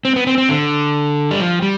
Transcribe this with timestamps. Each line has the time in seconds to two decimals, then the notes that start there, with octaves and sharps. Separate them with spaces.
0.05 C4
0.16 B3
0.27 C4
0.38 C4
0.49 D3
1.31 G3
1.40 F3
1.62 G3